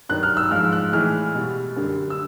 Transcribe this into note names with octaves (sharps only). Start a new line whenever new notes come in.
G2 D#3 F#3 F#6
F6
E6
G#2 F3 G#3 F6
F#6
A2 E3 G#3 F6
B2 G3
F#2 D3 G3
E6